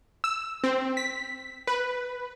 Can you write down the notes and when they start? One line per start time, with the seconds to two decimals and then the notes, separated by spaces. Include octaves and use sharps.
0.24 E6
0.64 C4
0.97 B6
1.67 B4